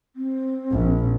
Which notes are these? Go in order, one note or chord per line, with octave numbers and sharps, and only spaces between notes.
C4
A#1